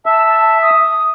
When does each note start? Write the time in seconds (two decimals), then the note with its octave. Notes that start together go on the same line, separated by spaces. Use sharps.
0.06 E5 A5
0.28 A5
0.62 D#6